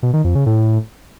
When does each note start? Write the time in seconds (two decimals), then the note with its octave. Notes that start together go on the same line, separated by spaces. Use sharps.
0.03 B2
0.14 D#3
0.24 F2
0.35 C#3
0.46 A2